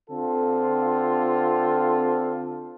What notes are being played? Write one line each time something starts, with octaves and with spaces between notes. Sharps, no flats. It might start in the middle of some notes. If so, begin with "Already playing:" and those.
D3 C4 F4 A4